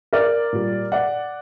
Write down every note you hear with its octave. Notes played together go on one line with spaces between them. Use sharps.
A#4 D5
A#2 G3
D5 F#5